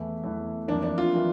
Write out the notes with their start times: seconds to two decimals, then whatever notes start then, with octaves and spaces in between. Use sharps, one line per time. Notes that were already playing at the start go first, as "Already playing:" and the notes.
Already playing: E2 E3 A3
0.23 E2 E3 A3
0.68 F2 E3 A#3 D4
0.83 D4
0.98 F4
1.15 E3 A#3